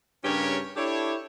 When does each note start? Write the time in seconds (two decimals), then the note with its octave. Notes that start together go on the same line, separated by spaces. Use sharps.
0.24 G2 C#3 C#4 G4 A#4 C#5
0.77 D4 E4 G4 A4 C#5